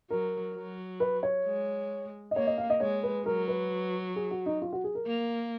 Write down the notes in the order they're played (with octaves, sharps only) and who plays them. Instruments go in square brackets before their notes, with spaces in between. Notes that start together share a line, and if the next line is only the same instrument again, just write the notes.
[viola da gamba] F#3 [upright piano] A#4
[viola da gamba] F#3
[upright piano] B4
C#5
[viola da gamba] G#3
[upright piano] D#5
[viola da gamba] A#3 [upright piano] C#5
[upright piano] D#5
F5
D#5
[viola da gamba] G#3 [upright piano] C#5
[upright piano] B4
[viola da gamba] F#3 [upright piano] A#4
[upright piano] B4
G#4
F#4
D#4
F4
F#4
G#4
A#4
[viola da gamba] A#3